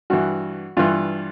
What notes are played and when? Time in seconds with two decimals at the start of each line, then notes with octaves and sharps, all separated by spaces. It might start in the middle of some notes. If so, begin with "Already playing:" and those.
0.10 G2 E3 F#4
0.77 G2 E3 F4